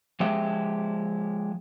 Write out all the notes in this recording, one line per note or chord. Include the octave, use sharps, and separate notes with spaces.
F3 G#3 G4 E5